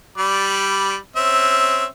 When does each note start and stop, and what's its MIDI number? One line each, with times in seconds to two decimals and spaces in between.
0.17 0.97 55
0.17 0.97 74
0.17 0.97 83
1.16 1.85 60
1.16 1.85 61
1.16 1.85 76